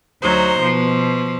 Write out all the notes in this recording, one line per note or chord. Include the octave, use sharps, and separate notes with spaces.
D2 F#3 D#4 C5
B2 F3